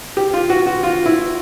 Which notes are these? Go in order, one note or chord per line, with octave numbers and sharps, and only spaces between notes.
G4
F4
F#4
F#4
F4
E4